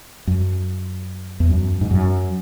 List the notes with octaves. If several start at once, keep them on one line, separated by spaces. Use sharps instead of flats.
F#2
E2
F#2
G#2
F#2